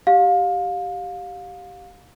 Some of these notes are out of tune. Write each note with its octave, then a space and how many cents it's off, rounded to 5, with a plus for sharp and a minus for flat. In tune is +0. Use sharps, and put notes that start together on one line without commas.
G4 -15 F5 +25